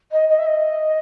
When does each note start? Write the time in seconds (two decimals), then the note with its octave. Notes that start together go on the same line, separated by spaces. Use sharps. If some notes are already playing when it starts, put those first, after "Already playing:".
0.11 D#5
0.28 D#5
0.38 E5
0.46 D#5